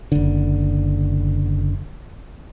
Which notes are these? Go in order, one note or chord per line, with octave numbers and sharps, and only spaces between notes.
F#1 D3